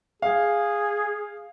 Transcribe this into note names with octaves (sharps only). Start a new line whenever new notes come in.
G#4 F5